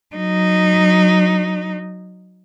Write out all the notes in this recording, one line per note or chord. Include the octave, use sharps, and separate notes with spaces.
F#3 D#4